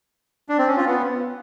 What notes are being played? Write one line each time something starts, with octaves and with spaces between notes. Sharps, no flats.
D4
C4
C#4
F4
B3